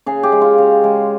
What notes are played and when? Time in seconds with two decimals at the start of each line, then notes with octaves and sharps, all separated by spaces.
0.06 C#3 G#4
0.23 G4
0.32 G#3
0.42 F4
0.58 C#3
0.84 G#3